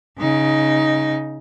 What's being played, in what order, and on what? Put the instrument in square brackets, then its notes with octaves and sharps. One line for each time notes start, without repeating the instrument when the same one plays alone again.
[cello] C#3 D#4